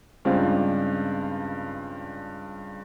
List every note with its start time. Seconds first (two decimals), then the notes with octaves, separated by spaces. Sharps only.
0.25 G2 C#3 G#3 C4 D4 F4